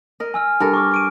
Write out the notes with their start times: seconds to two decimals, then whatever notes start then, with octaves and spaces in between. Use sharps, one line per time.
0.20 A#4 D#5
0.34 G#5 E6 F6
0.60 G2 A4 A#4
0.74 C#6 D6 F6
0.92 C#6 D7 D#7